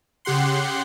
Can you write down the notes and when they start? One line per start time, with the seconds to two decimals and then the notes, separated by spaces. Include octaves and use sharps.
0.25 C#3 G4 F#5 C6